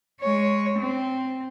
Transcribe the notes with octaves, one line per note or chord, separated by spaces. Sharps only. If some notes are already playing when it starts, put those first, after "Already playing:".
G#3 C#5
C4